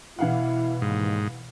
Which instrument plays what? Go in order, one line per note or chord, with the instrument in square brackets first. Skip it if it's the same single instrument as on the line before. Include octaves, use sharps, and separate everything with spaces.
[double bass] B2 [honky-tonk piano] E3 F5 F#5 [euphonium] E4
[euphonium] D#2 [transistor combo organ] G#2